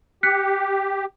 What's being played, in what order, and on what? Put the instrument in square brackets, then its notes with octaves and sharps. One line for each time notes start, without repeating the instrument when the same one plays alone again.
[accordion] G4 [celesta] F#6 B6 C#7